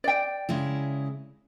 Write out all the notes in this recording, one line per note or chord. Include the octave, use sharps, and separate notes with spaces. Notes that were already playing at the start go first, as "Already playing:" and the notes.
D5 G5
C#3 G#3 E4